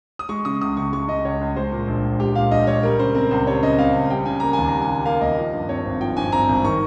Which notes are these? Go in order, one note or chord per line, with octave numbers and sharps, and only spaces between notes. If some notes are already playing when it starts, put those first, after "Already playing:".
D#6
G#3 C#6
C#3 D#6
C#2 D#6
C#2 C#6
G#3 C#6
C#3 D#5
C#2 C#5
C#2
G#3 C5
A#2
A#1
A#1
G#3 G4
A#2 F5
A#1 D#5
A#1 C#5
G3 A#4
C#3 C5
C4 A#4
C#2 C5
G3 C#5
C#3 D#5
C4 F5
C#2
G3 G5
C#3 G#5
A#3 A#5
G#5
D#2
A#5
G3
G#5
C#3
A#3 F5
D#2 D#5
F3
G2
C4 C#5
G#1
F3 G5
G2 G#5
C4 A#5
G#1
D#3 C#6